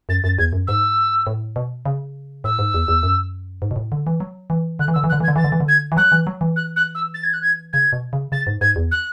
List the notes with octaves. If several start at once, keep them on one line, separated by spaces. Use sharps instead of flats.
F#2 A6
F#2 A6
E2 G#6
F#2
G#2 E6
A2
B2
C#3
A2 E6
G#2
E2
E2
F#2
G#2
B2
A2
D3
E3
F#3
E3
D3 F#6
E3
D3 E6
E3
F#6
D3
E3
G#6
D3
E3 A6
D3
E3
D3
G#6
E3
F#3 F#6
E3
F#3
E3
F#6
F#6
E6
A6
G#6
F#6
G#6
C#3 G#6
B2
C#3
C#3 A6
G#2
G#2 G#6
E2
F#6